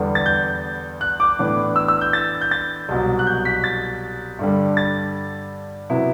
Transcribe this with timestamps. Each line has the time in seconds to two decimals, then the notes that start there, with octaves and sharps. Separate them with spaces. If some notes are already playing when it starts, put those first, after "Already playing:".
Already playing: E2 D3 G3 B3
0.15 A6
0.26 G6
1.01 F#6
1.20 D6
1.39 A2 E3 B3 D4
1.76 E6
1.88 E6
2.01 G6
2.13 A6
2.41 G6
2.51 A6
2.89 C2 B2 F#3
3.19 F#6
3.27 G6
3.45 B6
3.64 A6
4.39 G2 D3 G3
4.77 A6
5.90 C3 F#3 B3 E4